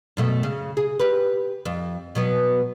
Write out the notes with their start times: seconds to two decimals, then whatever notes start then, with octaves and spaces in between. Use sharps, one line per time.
0.17 F#2 B2 A3
0.43 C#3
0.77 G#4
1.00 G4 B4
1.65 F2
2.15 B2 F#3 B3